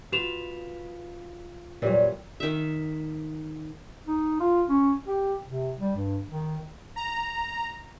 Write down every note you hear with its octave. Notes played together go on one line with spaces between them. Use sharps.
F4 F#4 B4 E7 F7
E2 A#2 E3 F#3 G3 C#5
D#3 E5
D#4
F4
C#4
G4
C3
G3
G2
D#3
A#5